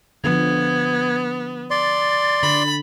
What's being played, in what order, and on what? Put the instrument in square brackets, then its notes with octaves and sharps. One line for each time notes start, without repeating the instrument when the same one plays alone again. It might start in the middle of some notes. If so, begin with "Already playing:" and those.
[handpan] D3 F3 [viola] B3 [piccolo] G#6
[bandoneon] D5 C6 [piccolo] A6
[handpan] D3 [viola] B5